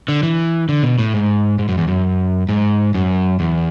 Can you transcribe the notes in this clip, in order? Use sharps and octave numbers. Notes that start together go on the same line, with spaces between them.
D3
E3
D3
B2
A2
G#2
G#2
F#2
E2
F#2
G#2
F#2
E2